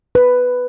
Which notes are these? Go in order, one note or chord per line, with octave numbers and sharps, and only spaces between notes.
B4